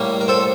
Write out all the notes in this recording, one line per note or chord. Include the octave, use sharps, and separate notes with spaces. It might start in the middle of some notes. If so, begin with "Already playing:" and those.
Already playing: A2 G3 A#3
A#4
A4 C5